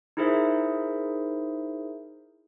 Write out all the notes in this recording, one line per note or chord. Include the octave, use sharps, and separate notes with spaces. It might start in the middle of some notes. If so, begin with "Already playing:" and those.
D#4 E4 G#4 A#4 C5 E5